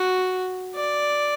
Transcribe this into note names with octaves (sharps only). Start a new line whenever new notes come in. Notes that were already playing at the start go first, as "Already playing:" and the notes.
Already playing: F#4
D5